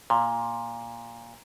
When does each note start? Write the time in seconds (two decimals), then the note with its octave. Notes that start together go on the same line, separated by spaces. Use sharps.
0.10 A#2